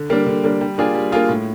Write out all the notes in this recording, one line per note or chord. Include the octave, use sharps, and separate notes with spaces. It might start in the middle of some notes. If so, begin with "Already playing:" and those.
Already playing: D3
G3 A#3 D4
D3
G3 A#3 D4
G3
A#3 D4 F4 G#4
G3
A#3 D4 F4 G#4
A2